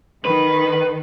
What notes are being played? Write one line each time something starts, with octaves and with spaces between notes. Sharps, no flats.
D#3 B4